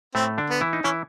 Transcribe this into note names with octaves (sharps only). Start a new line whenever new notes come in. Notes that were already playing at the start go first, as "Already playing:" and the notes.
A2 A3 C4
D3 D4
B3
E3 E4
D#4
E3 C#4 E4